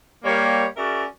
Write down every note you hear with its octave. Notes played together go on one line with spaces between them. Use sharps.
G3 A#3 C#5
C#4 F#4 G#4 A#4 D5 E5